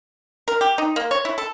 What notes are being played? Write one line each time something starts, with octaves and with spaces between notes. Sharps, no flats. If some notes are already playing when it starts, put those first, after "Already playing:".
A#4
G4
D#4
A#3
C#5
E4
A4